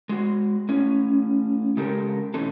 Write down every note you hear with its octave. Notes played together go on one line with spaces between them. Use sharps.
G#3 F#4
A2 C#4
C#3 G#3 G4 A4 A#4
B2 E3 A3 C#4 D#4 A4